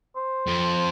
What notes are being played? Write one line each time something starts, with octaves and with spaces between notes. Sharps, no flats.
C5
F2